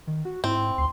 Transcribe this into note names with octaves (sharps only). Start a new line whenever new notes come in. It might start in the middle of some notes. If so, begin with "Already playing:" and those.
D#3
F#4
G#2 C4 E4
D2 C6